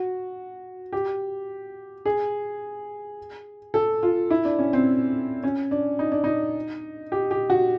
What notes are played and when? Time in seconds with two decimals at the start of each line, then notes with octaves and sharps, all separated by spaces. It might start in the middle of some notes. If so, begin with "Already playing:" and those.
Already playing: F#4
0.93 G4
2.05 G#4
3.74 A4
4.03 F4
4.30 E4
4.45 D4
4.59 C#4
4.73 C4
5.44 C#4
5.71 D4
5.99 D#4
6.12 D4
6.24 D#4
7.12 G4
7.31 G4
7.50 F#4